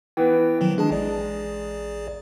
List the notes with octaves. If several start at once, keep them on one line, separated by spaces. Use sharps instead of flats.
E3 B3 G5
D#3 F3 F#3
G#3 D4 G#4 A5
A1 G#4 D5